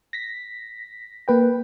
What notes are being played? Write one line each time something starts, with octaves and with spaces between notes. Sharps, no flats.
A#6 B6
A#3 B4 G5